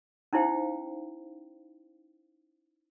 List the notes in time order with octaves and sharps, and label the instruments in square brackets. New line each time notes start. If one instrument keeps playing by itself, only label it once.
[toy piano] C#4 D#4 E4 C5 F5 G5